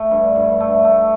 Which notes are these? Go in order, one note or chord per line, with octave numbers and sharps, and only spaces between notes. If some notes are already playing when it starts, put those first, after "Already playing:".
Already playing: A3
G2
G2
A3
A3